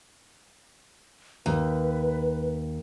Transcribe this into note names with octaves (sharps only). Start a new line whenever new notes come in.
D#2 B4